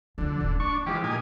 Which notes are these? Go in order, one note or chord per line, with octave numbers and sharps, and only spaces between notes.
D2 D3 F3
D#1 G#2
A#3 D4 C#6
E3 F3 G#3 G4
A#2 D#4 G#5